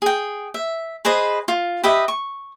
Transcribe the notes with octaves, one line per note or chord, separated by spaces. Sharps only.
G#4 G5
E5
G#4 B4 C5 D#5
F4
G4 B4 D#5 E5
C#6